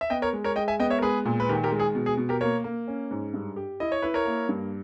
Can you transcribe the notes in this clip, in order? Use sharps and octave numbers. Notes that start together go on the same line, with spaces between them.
E5
B3 D#5 G5
A#4 C#5
G#3
A#4 C#5
G#3 D#5 G5
E5 G#5
B3 D#5 G5
C#5 E5
A#4
G#3 G#4 B4
A#2
B4
D#3 G4 A#4
G4 A#4
G#3
G#4
B2
G#4
B2
G4 A#4
A#3 A#4 C#5
A#3
C#4
G#2
G2
G4
E4 D#5
C#5
E4 B4
A#4 C#5
A#3
G2